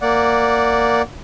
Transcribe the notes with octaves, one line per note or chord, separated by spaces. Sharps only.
A#3 D5 F#5